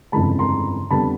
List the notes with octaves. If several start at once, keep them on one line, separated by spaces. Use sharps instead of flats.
G1 F2 C#3 E3 G#3 A5 B5
A#5 C6
F2 D3 G3 B3 A5 B5